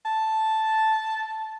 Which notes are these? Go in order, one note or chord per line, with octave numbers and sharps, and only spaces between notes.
A5